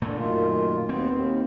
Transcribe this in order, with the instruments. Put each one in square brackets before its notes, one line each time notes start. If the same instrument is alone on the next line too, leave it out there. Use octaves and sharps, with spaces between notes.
[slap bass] A#2 A3 [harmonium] D3
[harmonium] F#2 D#3 F4
[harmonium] D#2 B3 [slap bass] C4
[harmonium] D#2